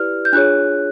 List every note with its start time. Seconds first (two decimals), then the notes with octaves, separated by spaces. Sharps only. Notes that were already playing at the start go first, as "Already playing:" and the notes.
Already playing: E4 G4 B4 D5 F6
0.25 G6
0.33 D4 F4 G#4 C#5 F#6